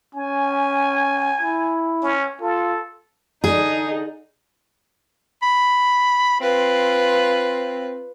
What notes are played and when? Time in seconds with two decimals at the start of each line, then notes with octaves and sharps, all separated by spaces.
0.15 C#4 G#5
1.41 E4
2.03 C#4
2.41 F4 A4
3.44 D3 D#4 G#4
5.42 B5
6.40 C4 F4 B4